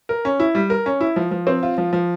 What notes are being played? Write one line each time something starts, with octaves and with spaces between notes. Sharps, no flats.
A#4
C#4
E4
G3
A#4
C#4
E4
F3
F3
C4
F4
F3
F3